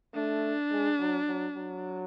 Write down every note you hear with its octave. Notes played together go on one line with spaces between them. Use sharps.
A3 D4
G#3
F#3
F#3
F#3